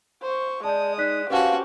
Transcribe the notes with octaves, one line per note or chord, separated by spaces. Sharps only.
C5 C#6
G#3 D5 A5 D#6 G6
D#4 D5 F#6 B6
C#4 F#4 G4 B4 C5 F5 F#5 A5